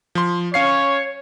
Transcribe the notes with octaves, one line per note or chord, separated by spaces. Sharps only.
F3 C6
C#4 C#5 F5 C7